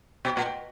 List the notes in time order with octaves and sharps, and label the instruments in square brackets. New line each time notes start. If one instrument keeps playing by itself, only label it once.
[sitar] B2 [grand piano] G5
[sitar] A#2 [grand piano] F#5
[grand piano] G5